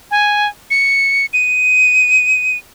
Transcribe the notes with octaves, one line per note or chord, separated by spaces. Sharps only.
G#5
C#7
D#7